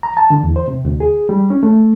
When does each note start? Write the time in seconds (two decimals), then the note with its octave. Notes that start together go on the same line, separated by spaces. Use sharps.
0.03 A#5
0.17 A5
0.30 D3
0.43 E2
0.56 C5
0.68 C3
0.85 D2
1.00 G#4
1.29 G3
1.50 C#4
1.63 A3